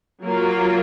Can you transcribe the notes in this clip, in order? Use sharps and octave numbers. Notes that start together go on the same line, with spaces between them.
F#3 A#3 F4